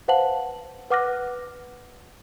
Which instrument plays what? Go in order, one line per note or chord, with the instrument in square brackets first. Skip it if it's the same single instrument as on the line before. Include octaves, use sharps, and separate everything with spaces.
[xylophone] B4 C5 F5 F#5 A5 F#7
B4 F#5 D6 F6 F#6 A#6